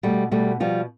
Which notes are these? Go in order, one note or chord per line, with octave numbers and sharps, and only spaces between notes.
B2 G3 A3
B2 G3 A3
B2 F3 G3